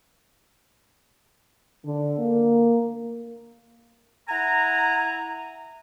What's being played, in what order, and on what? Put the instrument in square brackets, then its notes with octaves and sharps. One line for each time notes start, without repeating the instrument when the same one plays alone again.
[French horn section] D3
A#3
[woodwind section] E4 F#5 G#5 A#5